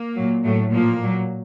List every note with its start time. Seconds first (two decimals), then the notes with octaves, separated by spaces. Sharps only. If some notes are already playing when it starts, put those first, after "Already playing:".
Already playing: A#3
0.15 A#2 F#3
0.44 A2 F#3 A3
0.72 A#2 F3 A#3
1.02 A#2 F#3